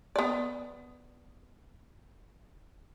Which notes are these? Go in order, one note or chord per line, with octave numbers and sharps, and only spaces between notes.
B3 D5